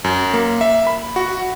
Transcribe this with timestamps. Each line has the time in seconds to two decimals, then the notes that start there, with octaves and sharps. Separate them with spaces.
0.04 F#2
0.34 A#3
0.61 E5
0.87 B5
1.16 F#4